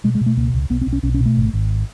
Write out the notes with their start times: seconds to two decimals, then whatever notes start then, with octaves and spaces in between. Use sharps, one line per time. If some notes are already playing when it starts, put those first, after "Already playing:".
0.04 B2 G#3
0.15 G#3
0.21 B2
0.26 A3
0.37 C#2 A#3
0.54 C#2
0.70 B1 B3
0.81 C4
0.86 B1
0.93 C#4
1.03 B1 C#4
1.14 C#4
1.20 B2
1.26 A3
1.37 G#1
1.53 G#1